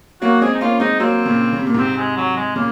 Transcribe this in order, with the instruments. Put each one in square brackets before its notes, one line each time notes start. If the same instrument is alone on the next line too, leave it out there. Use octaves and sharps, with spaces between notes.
[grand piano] F#3 A#3 [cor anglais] F#4
[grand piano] G#3 C4 [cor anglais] G#4
[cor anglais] D#4
[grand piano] A#3 C#4 [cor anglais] F4
[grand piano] G#3 C4 [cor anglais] D#4
[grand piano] F#3 A#3 [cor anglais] C4
[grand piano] A#2 C#3
C#3
C3
A#2
[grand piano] G#2 C3 [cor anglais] C4
[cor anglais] G#3
F#3
G#3
[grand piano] A#2 C#3 [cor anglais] A#3